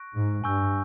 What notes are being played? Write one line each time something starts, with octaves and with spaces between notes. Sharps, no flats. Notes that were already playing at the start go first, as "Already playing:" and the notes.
Already playing: C#6 F#6 A#6 D7
G#2
G2 G#5 C#6 E6 G6